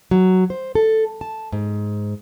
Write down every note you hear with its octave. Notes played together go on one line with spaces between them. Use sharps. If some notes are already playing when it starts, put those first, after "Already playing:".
F#3
C5
A4
A5
G#2